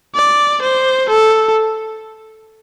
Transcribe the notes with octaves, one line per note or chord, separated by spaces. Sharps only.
D5
C5
A4